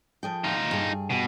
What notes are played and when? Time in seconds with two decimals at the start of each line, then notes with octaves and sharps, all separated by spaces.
0.23 F3 G#4 G5
0.44 D#4 F4
0.71 G2 G#4
1.10 B2